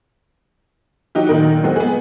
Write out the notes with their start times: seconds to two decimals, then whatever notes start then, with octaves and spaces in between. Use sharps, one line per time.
1.15 F#3 D#4 F#4 G4
1.29 A#2 D#3 A#4
1.64 F#3 G#3 B3 C4 F#4
1.76 B3 G#4